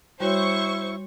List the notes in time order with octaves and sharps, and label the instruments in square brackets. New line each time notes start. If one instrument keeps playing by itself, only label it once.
[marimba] G3 F#4 C#5 [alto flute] E4 [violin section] C5 C#6